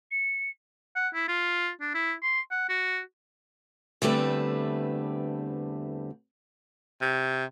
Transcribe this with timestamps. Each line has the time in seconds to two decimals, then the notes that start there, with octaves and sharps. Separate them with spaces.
0.11 C#7
0.96 F#5
1.14 E4
1.28 F4
1.81 D4
1.95 E4
2.23 C6
2.51 F#5
2.69 F#4
4.02 E2 D3 G3 A3 C4 B4
7.01 C3